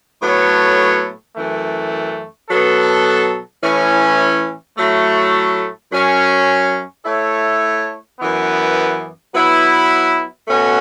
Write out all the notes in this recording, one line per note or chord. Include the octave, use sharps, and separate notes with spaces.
A2 F#3 B3 A4 C#5
F#2 E3 A3
B2 F#3 B3 A4
A2 E3 C#4
A2 F#3 A3
F#2 F#3 C#4
A3 E4 A4 C#5
F#2 E3 B3
F#3 B3 E4 B4
B2 A3 C#4 F#4